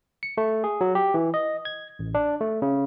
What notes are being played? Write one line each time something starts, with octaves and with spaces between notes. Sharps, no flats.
C#7
A3
G#4
F#3
G4
E3
D#5
G#6
A1
D4
A3
C#3